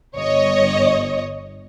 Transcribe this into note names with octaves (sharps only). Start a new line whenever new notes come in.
G1 C#5 D#5